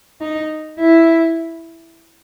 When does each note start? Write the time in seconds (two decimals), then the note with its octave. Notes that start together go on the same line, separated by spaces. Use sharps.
0.21 D#4
0.78 E4